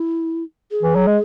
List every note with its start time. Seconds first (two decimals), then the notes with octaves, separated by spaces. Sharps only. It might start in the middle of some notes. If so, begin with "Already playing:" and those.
Already playing: E4
0.71 G#4
0.83 E3
0.95 F#3
1.07 G#3